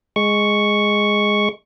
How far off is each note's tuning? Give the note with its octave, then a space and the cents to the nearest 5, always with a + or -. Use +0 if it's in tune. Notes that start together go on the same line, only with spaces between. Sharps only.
G#3 +0 C#6 +0